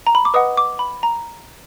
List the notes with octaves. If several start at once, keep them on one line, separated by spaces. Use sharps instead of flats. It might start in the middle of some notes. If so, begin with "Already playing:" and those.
A#5
B5
D6
B4 D#5 F#5 D#6
D6
B5
A#5